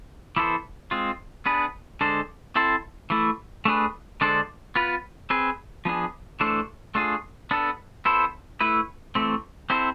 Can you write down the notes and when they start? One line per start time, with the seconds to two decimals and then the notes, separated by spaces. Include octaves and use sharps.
0.36 E3 B3 E4 A4 C5
0.91 G#3 C4 F4
1.46 B3 D4 G#4 B4
2.01 D3 G#3 D4 A4 C5
2.56 C4 E4 A4 C5
3.10 E3 A3 E4
3.65 A3 D4 G#4 B4
4.21 D3 G#3 D4 A4 C5
4.76 B3 F4 B4
5.30 C4 G#4 B4
5.85 F3 B3 D4 G#4
6.40 E3 A3 D4 A4 C5
6.95 A3 D4 F4 G#4
7.51 B3 D4 A4
8.05 B3 E4 A4 C5
8.60 A3 E4 B4
9.15 E3 A3 C4
9.70 C4 E4 A4 C5